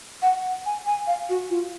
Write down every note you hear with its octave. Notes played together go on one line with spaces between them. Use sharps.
F#5
G#5
G#5
F5
F#4
F4